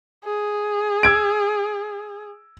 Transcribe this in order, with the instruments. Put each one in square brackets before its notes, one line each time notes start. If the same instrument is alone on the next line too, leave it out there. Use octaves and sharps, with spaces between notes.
[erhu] G#4
[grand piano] E6 G#6 D7